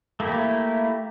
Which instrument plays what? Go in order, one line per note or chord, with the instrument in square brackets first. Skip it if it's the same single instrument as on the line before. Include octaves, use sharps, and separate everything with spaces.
[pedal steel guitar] A3 A#3 E4 G4